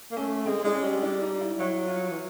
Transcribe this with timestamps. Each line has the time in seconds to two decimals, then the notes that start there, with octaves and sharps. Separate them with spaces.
0.11 A#3
0.17 A3 C#4
0.46 G#3 C4
0.64 G#3 D4
0.75 C#4
0.83 G3
1.03 D4
1.22 D#4
1.41 E4
1.59 F#3 E4
1.87 F4
2.10 E3